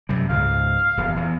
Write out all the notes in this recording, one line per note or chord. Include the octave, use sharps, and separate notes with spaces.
F#2 C3 G3
C#2 G#2 F5
D#1 E2
E2